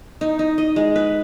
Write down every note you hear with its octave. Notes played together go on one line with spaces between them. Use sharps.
D#4
D#4
D#5
G#3
B4